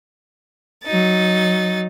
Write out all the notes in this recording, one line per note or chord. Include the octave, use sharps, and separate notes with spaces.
F#3 D#4 A6